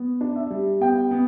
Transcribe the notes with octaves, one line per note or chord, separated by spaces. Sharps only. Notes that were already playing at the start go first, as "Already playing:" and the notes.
Already playing: B3
D4
E5
G3
B3 G5
B3